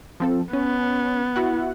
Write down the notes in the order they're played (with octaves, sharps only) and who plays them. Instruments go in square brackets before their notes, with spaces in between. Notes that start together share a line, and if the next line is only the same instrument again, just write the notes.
[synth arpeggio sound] F3 C4 A4
[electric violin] B3 [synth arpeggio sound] C#4
[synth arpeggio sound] E4 F#4 F#5